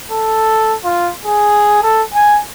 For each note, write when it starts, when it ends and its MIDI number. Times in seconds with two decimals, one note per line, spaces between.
0.11 0.75 69
0.84 1.10 65
1.26 1.81 68
1.83 2.02 69
2.14 2.40 80